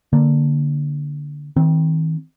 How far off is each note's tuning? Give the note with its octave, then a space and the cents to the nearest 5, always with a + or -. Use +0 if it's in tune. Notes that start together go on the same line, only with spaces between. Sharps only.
D3 +0 A#3 +0
D#3 +40 C4 +0